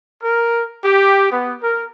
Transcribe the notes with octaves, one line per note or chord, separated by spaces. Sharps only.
A#4
G4
B3
A#4